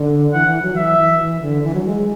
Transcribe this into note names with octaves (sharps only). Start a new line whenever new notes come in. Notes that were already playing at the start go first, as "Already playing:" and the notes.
Already playing: D3
E3 F#5
E3
F#3
E3 E5
E3
E3
D3
E3
F#3
G#3